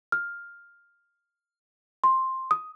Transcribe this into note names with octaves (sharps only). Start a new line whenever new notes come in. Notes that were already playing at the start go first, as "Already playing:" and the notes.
F6
C6
D#6